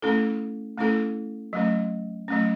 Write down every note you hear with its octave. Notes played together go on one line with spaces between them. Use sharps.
A3 C#4 E4 A4
A3 C#4 E4 A4
F#3 A3 C#4
F#3 A3 C#4